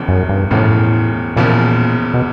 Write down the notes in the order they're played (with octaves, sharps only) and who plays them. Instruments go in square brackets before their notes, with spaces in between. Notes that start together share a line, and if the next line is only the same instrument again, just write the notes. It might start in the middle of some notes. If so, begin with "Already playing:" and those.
Already playing: [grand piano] E1 E2 C#3 F3
[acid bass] F#2
G2
[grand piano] E1 E2 C#3 F3 [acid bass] A2
[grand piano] E1 E2 C#3 F3 [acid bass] A#2
[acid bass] B2